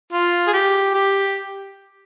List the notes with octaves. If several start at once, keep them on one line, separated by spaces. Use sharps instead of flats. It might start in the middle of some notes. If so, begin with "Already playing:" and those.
F4
G#4
G4
G4